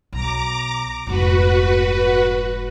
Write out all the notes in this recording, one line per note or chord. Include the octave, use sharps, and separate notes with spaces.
B1 A#5 D6
F1 G#2 F#4 B4